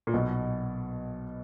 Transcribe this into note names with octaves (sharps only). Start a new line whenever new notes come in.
A#2
B1 B2